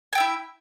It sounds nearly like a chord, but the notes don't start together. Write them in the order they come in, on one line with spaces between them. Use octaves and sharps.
G#5 G5 E5 E4